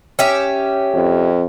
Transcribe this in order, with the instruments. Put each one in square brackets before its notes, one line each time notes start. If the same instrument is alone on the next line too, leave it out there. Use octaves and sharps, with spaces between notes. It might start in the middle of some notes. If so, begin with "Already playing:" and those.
[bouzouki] C#4 G4 E5
[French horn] F2